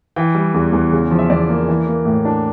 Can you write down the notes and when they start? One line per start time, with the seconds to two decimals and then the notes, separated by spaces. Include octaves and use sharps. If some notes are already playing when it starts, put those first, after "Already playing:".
0.16 E3 G5
0.35 G3
0.54 E2
0.73 E2
0.92 C#3
1.11 F3
1.19 E5
1.30 E2 D5
1.49 A#3
1.68 E3
1.87 A#3
2.05 A2
2.25 D4